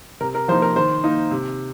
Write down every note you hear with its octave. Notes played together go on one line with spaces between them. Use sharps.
C3 A#4
A#4
F3 A#3 D#4 C5
A#4
D#3 C5
A#3 D#4
C3